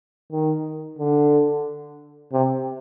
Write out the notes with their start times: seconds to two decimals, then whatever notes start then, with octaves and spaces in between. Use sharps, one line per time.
0.32 D#3
0.99 D3
2.32 C3